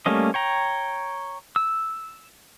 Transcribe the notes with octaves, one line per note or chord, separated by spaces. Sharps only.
G3 A3 A#3 C#4 D#5
C#5 G5 A#5
E6